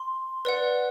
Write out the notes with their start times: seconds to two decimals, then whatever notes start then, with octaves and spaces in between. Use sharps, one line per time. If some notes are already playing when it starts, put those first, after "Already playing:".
Already playing: C6
0.45 B4 D5 F#5